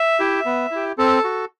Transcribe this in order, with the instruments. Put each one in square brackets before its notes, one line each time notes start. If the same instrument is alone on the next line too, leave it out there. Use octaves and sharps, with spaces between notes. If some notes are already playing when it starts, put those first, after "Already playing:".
Already playing: [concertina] E5
E4 G4
B3
E4 G4
C4 A4
F#4